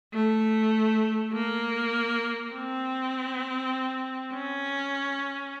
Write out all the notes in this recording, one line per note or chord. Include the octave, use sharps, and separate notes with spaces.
A3
A#3
C4
C#4